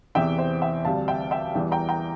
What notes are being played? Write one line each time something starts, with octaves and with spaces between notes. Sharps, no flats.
E2 C3 E3 E5 G5
C5 E5
E5 G5
D2 C3 G3 F5 A5
E5 G5
E5 G5
E2 E3 G3
G5 A#5
G5 A#5